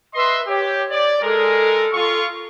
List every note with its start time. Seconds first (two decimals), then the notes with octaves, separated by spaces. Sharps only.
0.15 B4 D#5 E5 C6
0.47 G4 C#5
0.91 D5
1.22 G#3 A4 A#4
1.94 F4 C#6